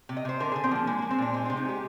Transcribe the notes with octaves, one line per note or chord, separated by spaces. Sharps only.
C3
D#5
C3 C5
D3 A#4
D3 G#4
C4
F3 A#3
G#3 A#3
G#3 A#3
C4
A#2 D4
G#3 C4
C3 C4
D#4
G#3 G4